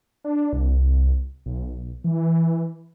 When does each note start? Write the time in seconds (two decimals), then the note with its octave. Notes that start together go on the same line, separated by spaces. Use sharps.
0.24 D4
0.53 C2
1.46 B1
2.04 E3